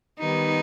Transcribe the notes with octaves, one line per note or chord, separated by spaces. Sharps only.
D#3 G3 B3 D#4